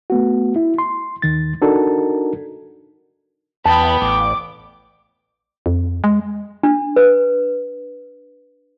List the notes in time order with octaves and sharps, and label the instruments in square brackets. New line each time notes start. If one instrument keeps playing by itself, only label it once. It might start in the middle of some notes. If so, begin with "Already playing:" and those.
[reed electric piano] A3 B3 F#4
E4
C6
D#2 D#3 A6
D4 D#4 F#4 A4 A#4
[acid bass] E2 [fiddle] B3 G5 [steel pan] A5 [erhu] B5
[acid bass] A1 [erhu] D6
[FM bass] F2
G#3
[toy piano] D4
B4